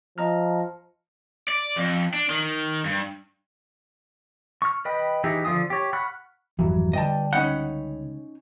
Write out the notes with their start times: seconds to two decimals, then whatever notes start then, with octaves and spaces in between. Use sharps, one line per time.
0.18 F3 D#5 A#5 F6
1.48 D5
1.76 F2
2.14 D4
2.30 D#3
2.85 G2
4.62 C#6 F6
4.85 B4 D#5 G5 B5
5.24 E3 D#4 E4 G4 G#4
5.45 D3 F3 A3 F4 D#6
5.70 G4 C#5
5.93 F#5 B5 C#6 F6 F#6
6.59 G#1 F2 E3 F#3 G3
6.93 D3 G3 B4 D5 D#5 G5 A5
7.33 C#2 C#4 D#4 C#5 F#5 G5 B5